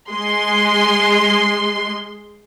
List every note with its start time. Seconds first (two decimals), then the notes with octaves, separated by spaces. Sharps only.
0.11 G#3 C6